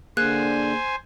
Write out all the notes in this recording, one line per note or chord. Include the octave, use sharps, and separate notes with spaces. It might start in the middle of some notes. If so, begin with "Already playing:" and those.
D3 A#3 G#4 C5 G#5 F#6